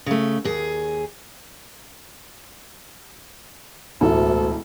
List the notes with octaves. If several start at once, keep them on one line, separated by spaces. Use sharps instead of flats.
C#3 A3
D#2 G#4
E1 A1 D2 A4